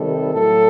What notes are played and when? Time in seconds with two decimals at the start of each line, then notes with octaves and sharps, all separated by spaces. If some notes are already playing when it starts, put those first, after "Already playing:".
Already playing: C3 D#3 G3 A4
0.34 A2 F#3 A4